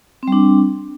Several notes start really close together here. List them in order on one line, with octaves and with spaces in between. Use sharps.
C4 G3 D4